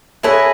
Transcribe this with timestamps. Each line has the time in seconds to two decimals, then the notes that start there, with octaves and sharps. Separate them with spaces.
0.23 E4 G#4 A4 B4 C#5 D#5